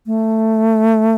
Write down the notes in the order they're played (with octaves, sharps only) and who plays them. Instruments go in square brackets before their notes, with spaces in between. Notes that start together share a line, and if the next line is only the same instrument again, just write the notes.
[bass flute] A3